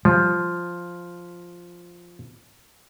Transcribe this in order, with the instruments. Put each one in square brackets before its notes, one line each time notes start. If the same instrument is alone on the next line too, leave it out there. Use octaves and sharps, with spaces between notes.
[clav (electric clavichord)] F3 [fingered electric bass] G3